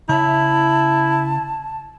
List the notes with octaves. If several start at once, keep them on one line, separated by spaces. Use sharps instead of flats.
C#3 E4 C#5 E5 A5